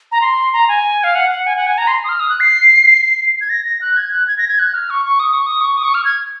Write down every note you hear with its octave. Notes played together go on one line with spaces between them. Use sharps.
A#5
C6
A#5
G#5
F5
F#5
F#5
G#5
F#5
G#5
A#5
C6
D#6
F6
D#6
F#6
C7
G#6
A#6
A#6
F#6
G#6
F#6
G#6
A#6
G#6
F#6
F6
C#6
C#6
D#6
C#6
D#6
C#6
D#6
C#6
F6
G#6